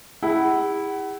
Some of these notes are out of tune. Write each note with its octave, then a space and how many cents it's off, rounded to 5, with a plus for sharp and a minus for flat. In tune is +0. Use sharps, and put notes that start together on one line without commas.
E4 -5 G#4 -40 F#5 +30